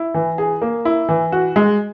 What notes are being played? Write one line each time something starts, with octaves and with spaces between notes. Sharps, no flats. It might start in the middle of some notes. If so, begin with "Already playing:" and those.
Already playing: E4
E3
G#4
A#3
E4
E3
F#4
G#3